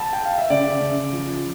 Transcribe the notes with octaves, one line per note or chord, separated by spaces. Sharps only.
A5
G5
F5
E5
C#3 D5
C#3
F3